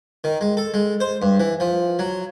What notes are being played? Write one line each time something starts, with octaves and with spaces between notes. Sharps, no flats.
D#3
G#3
A4
G#3
C5
G2
E3
F3
F#3